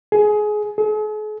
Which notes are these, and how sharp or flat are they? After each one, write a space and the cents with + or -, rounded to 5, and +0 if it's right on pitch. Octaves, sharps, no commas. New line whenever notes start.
G#4 +20
G#4 +45